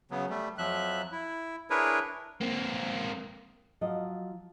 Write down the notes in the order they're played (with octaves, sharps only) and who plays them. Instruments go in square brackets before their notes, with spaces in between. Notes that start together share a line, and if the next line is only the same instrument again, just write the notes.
[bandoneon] C#3 F#3 B3
G3 A3
F2 F3 F#3 E5 F#6
E4
D4 E4 G#4 A#4 B4 C#5
[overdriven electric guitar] A#3 C4
[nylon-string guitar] F3 F#3 D#5 F5